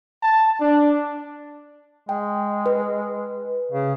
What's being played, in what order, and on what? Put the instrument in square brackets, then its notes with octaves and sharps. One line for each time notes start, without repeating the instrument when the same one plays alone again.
[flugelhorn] A5
D4
[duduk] G#3 [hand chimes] G5
[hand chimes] B4
[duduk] C#3